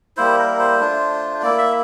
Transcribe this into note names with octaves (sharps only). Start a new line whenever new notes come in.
G3 A#3 E4 C5
A#4
C5
A3 D4 F4
A#3 E4 D5
E5